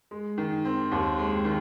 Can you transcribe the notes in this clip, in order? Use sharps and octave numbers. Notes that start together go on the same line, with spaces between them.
G#3
D#3
C4
D#2
G#3
D#3